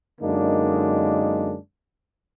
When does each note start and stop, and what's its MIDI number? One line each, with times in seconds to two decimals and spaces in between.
0.21 1.56 42
0.21 1.56 50
0.21 1.56 56
0.21 1.56 58
0.21 1.56 62
0.21 1.56 63